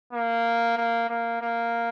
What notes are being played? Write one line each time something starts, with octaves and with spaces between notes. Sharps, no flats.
A#3
A#3
A#3
A#3